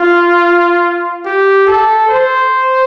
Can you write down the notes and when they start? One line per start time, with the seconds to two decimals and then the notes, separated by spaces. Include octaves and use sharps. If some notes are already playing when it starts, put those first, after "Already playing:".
Already playing: F4
1.25 G4
1.67 A4
2.09 C5